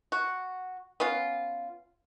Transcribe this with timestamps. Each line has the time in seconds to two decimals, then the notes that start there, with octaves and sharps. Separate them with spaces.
0.12 F#4
1.00 B3 C#4 F4